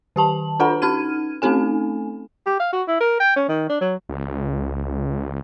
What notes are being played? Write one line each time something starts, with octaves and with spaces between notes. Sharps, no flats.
D#3 G4 A5 F#7
D4 F4 A4 B4 F#5 B5
C#4 D#4 F6 G#6 D#7
A3 C4 C#4 D#4 A4 G#5
G4
F5
F#4
E4
A#4
G5
C#4
D#3
D4
F#3
C#2